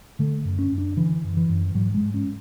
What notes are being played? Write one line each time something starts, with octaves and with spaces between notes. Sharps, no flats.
D3 A3
F#2
C#4
F#2
D4
D3 E3
F#2
E3
F#2
G#2 F#3
G#3
G#2
C#4